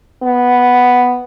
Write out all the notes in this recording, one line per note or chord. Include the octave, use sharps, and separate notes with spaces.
B3